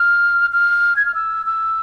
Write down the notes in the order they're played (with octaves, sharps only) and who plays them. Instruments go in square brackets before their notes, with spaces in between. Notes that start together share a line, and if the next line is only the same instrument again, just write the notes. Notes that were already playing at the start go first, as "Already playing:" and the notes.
Already playing: [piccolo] F6
F6
G#6
F6
E6
E6